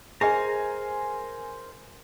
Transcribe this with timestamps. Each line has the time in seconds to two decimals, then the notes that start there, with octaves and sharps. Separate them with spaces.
0.21 G#4 A#4 C5 D#5 G#5 A#5